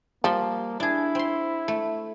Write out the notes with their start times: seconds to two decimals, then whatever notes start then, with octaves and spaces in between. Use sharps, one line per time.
0.24 F3 G3 A#3
0.80 D4 E4 G#4
1.15 C4 C6
1.68 A3